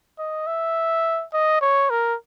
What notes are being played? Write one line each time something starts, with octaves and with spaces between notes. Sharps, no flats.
D#5
E5
D#5
C#5
A#4